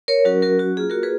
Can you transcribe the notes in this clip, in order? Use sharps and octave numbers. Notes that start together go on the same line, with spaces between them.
A#4 C#5
F#3 C#4 F#4 A#4
F#4 A#4
F#4
A#3 F4 G#4
F#4 A#4
G#4 B4